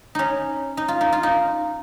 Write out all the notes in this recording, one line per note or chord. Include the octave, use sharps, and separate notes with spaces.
C#4 D#4
D#4
F4
D#4
F4
D#4